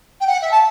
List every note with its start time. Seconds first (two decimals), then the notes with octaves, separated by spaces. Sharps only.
0.21 G5
0.27 F#5
0.42 E5
0.51 A5